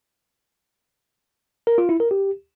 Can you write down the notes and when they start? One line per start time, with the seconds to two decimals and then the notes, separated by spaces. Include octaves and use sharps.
1.67 A#4
1.78 F4
1.89 E4
2.00 A#4
2.11 G4